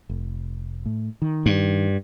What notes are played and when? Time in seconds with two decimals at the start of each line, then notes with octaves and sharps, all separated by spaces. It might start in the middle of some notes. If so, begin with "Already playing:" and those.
0.09 F1
0.86 A2
1.22 D#3
1.46 G2